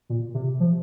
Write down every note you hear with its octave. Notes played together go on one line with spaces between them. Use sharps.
A#2
C3
F3